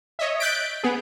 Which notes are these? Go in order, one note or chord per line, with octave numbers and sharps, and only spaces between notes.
C#5 D#5 E5
F#6 G6 A6 B6 D7
B3 G#4